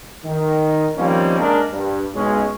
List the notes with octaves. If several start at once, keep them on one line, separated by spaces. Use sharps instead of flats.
D#3
D#3 F3 G3 A#3 C4 C#4
G#3 A#3 D4 G#4 A#4
G2
B1 G#3 C#4